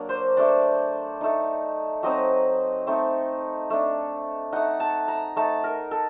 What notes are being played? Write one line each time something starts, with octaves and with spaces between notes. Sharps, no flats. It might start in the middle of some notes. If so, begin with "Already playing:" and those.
Already playing: F#3 A#3 D4
C5
A3 D4 D5
A3 D#4
F#3 C4 D#4 D#5
A3 C4 D#4
A3 D4
A3 D#4 F#5
A5
A#5
A3 D#4 A5
A#4
A4